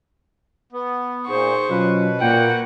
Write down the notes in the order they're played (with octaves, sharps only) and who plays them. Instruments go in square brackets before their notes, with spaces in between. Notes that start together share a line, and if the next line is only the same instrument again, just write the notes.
[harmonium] B3
[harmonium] A#2 [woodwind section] D#4 G#4 [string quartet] C5 C#6
[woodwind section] B2 [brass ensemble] F#3 C#4 F4 [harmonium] B4
[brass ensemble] A#2 [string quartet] A#3 F#4 F#5 [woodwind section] G5